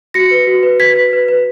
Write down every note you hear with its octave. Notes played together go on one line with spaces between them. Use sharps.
F#4 A#6 C#7
B4
F#4
B4
B4 G#6 B6
B4
B4
B4